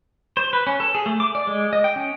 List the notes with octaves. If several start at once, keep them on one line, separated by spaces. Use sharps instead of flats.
C5
B4
C#4
A4
G#4
A3
D6
D5
G#3
D#5
G5
C#4